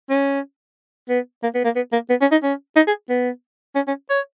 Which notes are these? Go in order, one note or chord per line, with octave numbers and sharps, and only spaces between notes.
C#4
B3
A#3
B3
A#3
B3
A#3
B3
C#4
D#4
C#4
D#4
G#4
B3
C#4
C#4
C#5